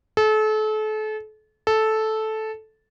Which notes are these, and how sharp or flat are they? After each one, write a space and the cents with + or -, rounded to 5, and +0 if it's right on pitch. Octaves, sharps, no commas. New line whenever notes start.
A4 -35
A4 -10